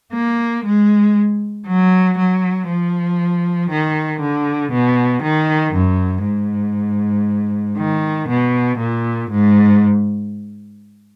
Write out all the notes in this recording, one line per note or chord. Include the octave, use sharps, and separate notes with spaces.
A#3
G#3
F#3
F#3
F3
D#3
D3
B2
D#3
F#2
G#2
D#3
B2
A#2
G#2